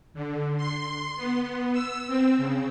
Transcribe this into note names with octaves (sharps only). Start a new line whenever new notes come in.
D3
C6
B3
E6
C4
C#3